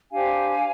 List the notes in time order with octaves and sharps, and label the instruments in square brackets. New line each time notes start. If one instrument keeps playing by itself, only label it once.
[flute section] D4 G4 C5 F5 G#5